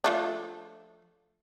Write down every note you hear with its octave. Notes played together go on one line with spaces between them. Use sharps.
F3 A3 D4